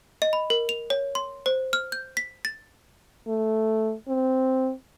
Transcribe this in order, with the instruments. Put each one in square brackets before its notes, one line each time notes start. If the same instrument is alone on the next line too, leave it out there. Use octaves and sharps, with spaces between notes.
[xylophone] D#5
B5
A#4
F7
C#5
C6
C5
F6
G6
B6
A6
[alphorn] A3
C4